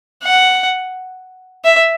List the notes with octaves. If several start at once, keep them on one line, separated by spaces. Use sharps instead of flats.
F#5
E5